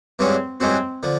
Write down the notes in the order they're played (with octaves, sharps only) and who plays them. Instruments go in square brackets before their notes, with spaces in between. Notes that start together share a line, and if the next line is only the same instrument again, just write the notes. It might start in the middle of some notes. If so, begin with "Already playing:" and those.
[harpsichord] G2 E3 G#3 C#4 F#4 [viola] C4
[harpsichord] G2 E3 G#3 C#4 F#4 [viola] C4
[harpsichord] D3 F3